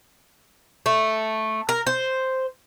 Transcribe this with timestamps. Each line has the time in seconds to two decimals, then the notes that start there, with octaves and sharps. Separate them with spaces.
0.86 A3
1.69 A#4
1.87 C5